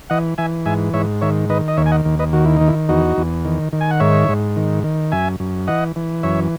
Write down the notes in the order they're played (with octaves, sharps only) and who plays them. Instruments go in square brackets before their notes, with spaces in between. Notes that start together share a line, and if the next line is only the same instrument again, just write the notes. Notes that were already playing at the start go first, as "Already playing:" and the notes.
[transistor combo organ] E3 D#5 F#5
E3 E5 G#5
G#2 E5 G#5
G#2 C#5 E5
D#3 C#5 E5
D#3 B4 D#5
D#5
D#2 C#5 E5
G#5
D#5 F#5
D#2
B4 D#5
D#3 F#4
E4
D#3 D#4
E4
E2 D#4 F#4
E2
D#3
D#3
G#5
F#5
G#2 C#5 E5
G#2
D#3
D#3
F#2 E5 G#5
F#2
E3 D#5 F#5
E3
F#2 C#5 E5